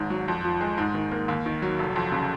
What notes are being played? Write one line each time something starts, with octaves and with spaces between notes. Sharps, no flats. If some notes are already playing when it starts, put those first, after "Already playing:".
Already playing: G#1 G#2
F#3
F2
F3
G#3
G#2
D#3
A#3
D#2
D#3
F#3
F1
F2
C#3